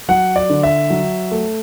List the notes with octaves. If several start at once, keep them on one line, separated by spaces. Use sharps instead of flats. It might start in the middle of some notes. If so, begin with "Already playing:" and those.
F#3 F#5
D5
D3
E5
F#3
A3